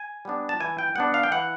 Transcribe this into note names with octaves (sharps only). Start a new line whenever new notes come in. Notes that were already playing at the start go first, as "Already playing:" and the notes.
Already playing: G#5
G3 B3 D4
A5
E3 G#5
G5
G3 B3 D4 F#5
F5
G5
E3 F#5